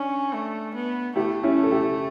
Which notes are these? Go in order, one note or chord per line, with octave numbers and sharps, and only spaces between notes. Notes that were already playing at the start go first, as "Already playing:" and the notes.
Already playing: C#4 D4
A3
B3
A3 E4 G4
C#4 E4
A4
E4 G4